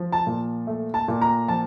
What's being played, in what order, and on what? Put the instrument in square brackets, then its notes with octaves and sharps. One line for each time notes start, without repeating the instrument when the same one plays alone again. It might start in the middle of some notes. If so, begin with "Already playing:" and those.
Already playing: [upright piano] F3
A5
A#2
A3
A5
A#2
A#5
F3 A5